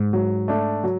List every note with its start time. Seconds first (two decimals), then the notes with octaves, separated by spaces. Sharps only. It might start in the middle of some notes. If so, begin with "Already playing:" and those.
Already playing: G#2
0.13 F#3
0.48 A3 D4
0.84 F#3